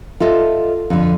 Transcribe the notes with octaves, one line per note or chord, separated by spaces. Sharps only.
F4 A4 D#5 E5
F2 D3